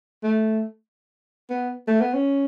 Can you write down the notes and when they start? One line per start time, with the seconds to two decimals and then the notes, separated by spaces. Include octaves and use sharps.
0.23 A3
1.50 B3
1.87 A3
2.01 B3
2.14 C#4